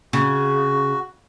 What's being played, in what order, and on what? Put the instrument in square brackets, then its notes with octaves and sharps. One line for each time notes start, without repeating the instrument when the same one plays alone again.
[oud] C#3 [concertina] F#4